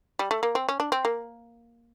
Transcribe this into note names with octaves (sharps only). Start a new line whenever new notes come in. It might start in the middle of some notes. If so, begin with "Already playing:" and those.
G3
A3
A#3
C4
C#4
D4
C4
A#3